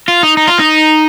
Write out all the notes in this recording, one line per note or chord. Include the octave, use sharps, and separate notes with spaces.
F4
D#4
D#4
F4
D#4